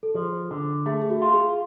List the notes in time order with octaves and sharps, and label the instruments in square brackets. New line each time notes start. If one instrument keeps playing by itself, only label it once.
[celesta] A4
[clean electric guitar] F3 [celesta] G#4
[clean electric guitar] D3
[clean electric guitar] A3 [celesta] G#4
[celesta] G#4
F#4
[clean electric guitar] F4
[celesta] G#4